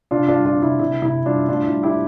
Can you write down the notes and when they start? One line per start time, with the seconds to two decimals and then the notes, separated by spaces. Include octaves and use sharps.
0.11 C3 D4 F4
0.28 D4 F4
0.34 G3
0.45 D4 F4
0.57 C3
0.62 E4
0.79 C3 E4
1.02 C3 E4
1.25 G3 D4 F4
1.49 A2 D4 F4
1.66 E4
1.71 G3
1.83 E4 G4